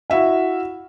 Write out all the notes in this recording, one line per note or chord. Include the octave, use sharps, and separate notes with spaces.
E4 F#4 E5 F5